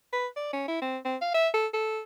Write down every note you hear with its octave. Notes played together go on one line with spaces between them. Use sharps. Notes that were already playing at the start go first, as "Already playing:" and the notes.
B4
D5
C#4
E4
C4
C4
F5
E5
A4
A4